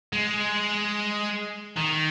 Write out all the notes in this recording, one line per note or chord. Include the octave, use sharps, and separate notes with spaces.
G#3
D#3